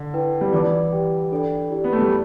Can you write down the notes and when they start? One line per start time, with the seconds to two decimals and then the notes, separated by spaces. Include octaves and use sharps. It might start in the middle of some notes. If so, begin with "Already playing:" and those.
Already playing: D3
0.14 E4 B4 G5
0.41 G3
0.53 E3 B4 D5 A5 D6
0.92 G4 B4 G5
1.31 D4 A4 D5 G5 B5
1.70 E4 G4 D5
1.84 B3
1.93 A3
2.02 G3